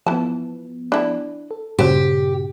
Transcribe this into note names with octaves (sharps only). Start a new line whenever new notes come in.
E3 F3 B3 A5
D4 E4
A4
G2 A#2 C#3 F#3 G4 C5